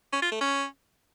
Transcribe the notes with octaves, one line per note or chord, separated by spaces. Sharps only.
C#4
F4
A3
C#4